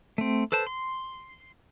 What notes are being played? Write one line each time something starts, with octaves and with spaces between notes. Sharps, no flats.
A3 C4
A4 B4 C5 A5
C6